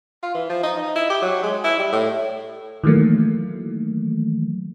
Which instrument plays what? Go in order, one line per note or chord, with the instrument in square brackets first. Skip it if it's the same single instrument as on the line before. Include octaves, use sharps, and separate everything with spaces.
[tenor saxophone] F4
E3
F3
D#4
D#4
E4
G4
F#3
G#3
E4
G3
A2
[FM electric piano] D#3 E3 F#3 A3 A#3